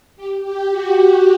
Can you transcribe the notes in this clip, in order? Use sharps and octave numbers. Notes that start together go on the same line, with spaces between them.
G4
G4
F#4